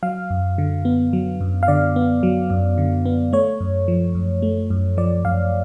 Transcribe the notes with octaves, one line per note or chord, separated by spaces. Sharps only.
F#3 F5
F#2
D3
B3
F#3
F#2
F5
D3 D5
B3
F#3
F#2
D3
B3
A3 C#5
F#2
F3
F#2
A3
F#2
F3 D5
F#2 F5